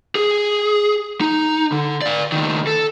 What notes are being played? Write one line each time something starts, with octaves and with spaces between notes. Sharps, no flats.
G#4
D#4
D3
D5 F5
C#2 D#3
A4